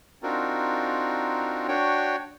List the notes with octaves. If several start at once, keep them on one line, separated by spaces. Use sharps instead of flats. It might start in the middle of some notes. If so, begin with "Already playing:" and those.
C4 D4 D#4 F4 F#4 A#4
D4 F#4 C#5 G5